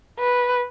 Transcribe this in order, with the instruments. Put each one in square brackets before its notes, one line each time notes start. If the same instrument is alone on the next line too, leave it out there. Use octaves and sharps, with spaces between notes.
[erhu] B4